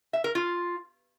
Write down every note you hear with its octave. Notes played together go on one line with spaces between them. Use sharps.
E5
A#4
F4